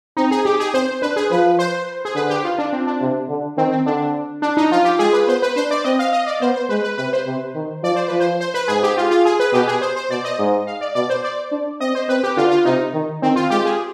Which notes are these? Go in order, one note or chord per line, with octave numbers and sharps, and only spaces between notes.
C4 D#4
G#4
G4
G#4
C4 C5
D4 B4
G#4
F3 B4
C5
G#4
D3 B4
G4
F4
D4
C4
D4
C3
D3
D#3 C4
C4
D3 D4
D4
D#4
F3 F4
G4
G#3 G#4
B4
B3 C5
B4
D4 C5
D5
C4 D#5
F5
D#5
D5
B3 C5
C5
G#3 B4
B4
C3 B4
C5
C3
D#3
F3 D5
C5
F3 B4
C5
C5
B4
G#2 G#4
G4
F4
F4
G#4
B4
B2 G4
G#4
C5
C5
B2 D5
D#5
G#2
F5
D5
B2 D5
C5
D5
D4
C4 D#5
C5
C4 B4
G4
D3 F4
F4
C3 D#4
D#3
D#3 C4
F4
G#3 G4
G#4